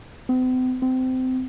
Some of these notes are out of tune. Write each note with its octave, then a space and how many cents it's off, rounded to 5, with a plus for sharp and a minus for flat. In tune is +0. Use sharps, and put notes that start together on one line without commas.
C4 -45
C4 -25